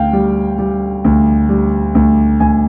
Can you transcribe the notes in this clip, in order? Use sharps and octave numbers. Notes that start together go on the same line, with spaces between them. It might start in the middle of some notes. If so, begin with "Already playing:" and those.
Already playing: D2 F5 G5
G3
G3
D2
G3
D2
D2 G#5